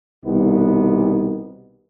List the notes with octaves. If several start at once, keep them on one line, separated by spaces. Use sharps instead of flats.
C2 B2 D#3 B3 D#4